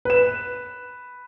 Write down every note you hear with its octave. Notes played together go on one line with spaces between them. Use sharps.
B4 E7